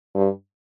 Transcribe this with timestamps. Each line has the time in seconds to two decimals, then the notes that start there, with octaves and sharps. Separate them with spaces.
0.15 G2